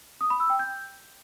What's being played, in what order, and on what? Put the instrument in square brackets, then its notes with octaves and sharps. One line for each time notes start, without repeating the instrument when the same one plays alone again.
[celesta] D#6
B5
E6
G5
G6